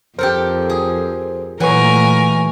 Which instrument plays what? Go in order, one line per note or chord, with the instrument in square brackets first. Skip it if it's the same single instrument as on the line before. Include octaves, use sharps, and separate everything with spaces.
[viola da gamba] F2 [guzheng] G4 A4 A#4 [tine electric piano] C5
[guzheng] G#4
[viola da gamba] A#2 A3 A#4 [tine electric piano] E3 B4 C#6 [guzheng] F#3 [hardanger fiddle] G#5